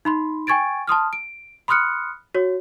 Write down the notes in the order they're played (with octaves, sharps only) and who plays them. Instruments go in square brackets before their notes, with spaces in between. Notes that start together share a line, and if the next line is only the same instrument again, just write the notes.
[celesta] D#4 B5 C6
G5 G#5 C#6 G#6 A6 D7
A5 C6 D#6 F6
D7
B5 C6 D#6 F6 F#6 C#7
F#4 C#5